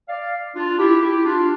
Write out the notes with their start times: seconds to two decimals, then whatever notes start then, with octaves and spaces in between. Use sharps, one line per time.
0.09 D5 F5
0.55 D4 F4
0.79 E4 G4
1.02 E4 G4
1.25 D4 F4